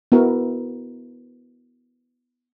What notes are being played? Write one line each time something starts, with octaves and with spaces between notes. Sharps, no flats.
B3 E4 F#4 A#4